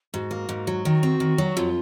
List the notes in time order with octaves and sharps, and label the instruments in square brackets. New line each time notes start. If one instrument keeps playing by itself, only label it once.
[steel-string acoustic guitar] G#2 [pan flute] F#4
[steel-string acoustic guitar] A#3
G#2
F#3
[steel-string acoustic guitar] D#3 [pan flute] F#4
[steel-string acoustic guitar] C4
D#3
F#3
[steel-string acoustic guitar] F2 [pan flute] F4